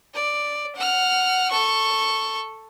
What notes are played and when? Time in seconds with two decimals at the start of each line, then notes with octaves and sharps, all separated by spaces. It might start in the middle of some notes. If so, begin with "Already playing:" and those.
0.14 D5
0.76 F#5 F6
1.51 A4 C#6